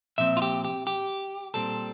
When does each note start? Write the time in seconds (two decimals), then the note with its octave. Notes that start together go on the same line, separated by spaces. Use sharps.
0.18 A#2 F3 C4 E5
0.37 F4
0.42 G4
0.65 G4
0.87 G4
1.54 A#2 G3 C4 A4